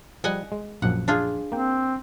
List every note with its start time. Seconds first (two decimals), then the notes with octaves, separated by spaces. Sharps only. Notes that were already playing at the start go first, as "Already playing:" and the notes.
0.24 F3 G3 D#5 F#5 G#5
0.52 G#3
0.82 A#1 F#2 F3 F#5
1.08 D4 F4 G#4
1.52 A#3 C4 G5